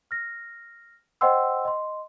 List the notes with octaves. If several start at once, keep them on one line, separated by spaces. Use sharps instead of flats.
F6 A#6
C5 D#5 F#5 G5 C6 E6
D#5 C6